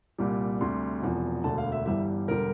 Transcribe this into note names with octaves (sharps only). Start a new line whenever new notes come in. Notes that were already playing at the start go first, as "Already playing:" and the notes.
C2 A#2 G3
D2 C3 G3 C6
E1 E2 C3 F3
E1 D2 D3 A5
F5
E5
G1 G2 E3 G3 E5
E1 D3 G3 A#4